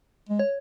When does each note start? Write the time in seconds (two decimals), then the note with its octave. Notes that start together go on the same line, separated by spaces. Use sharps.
0.29 G#3
0.39 C#5